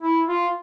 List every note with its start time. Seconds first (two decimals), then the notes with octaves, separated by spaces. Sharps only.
0.02 E4
0.28 F4